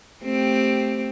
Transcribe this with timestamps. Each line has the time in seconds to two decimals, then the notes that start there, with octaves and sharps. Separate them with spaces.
0.24 A3 C4 G4